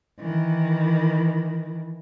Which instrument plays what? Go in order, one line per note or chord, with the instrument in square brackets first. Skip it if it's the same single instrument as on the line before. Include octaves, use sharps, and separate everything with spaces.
[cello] D#3 E3